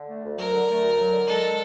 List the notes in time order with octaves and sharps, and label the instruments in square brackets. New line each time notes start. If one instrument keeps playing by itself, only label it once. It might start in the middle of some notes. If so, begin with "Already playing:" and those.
Already playing: [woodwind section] D3
A3
D2
[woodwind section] F#3 [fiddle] A#4
[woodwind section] D3
A3
D2
F#3
D3
[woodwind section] G#3 [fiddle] A4